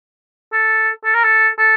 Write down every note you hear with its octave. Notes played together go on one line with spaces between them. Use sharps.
A4
A4
A#4
A4
A4